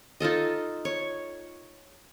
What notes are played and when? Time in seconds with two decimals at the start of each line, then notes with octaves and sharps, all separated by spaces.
0.20 D#4 F4 A4 D#5
0.85 C#5